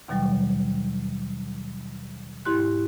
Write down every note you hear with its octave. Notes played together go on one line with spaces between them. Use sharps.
D#2 B2 D#3 F#3 G3 G5
G#2 E4 G4 C6 F#6